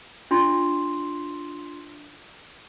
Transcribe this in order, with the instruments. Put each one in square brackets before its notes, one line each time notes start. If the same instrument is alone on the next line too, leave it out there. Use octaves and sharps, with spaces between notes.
[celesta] D4 F4 C6